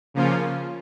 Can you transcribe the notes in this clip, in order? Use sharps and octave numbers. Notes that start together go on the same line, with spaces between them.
C#3 F3 A#3 C#4 F4